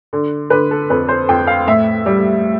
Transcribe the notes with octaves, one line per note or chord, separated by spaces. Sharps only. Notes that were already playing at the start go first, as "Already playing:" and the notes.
D3
D3 B4
A4
F2 B4
C5
F2 G5
F5
A2 E5
G3